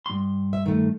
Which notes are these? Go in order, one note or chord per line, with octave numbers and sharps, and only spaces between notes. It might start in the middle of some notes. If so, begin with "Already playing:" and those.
G2 C6
E5
D#3 A3